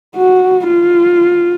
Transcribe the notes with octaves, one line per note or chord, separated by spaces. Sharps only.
F#4
F4